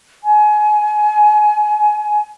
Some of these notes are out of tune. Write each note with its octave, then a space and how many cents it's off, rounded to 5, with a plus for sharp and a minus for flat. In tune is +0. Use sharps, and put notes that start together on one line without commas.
G#5 +25